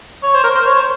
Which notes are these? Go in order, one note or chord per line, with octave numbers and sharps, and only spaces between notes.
C#5
C5
A#4
C5
C#5
C5